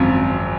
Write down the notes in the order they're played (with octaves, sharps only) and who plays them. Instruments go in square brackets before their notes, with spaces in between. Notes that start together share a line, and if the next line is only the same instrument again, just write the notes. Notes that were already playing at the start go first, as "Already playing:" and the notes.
Already playing: [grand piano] G#1 F#2 F3 [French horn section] C4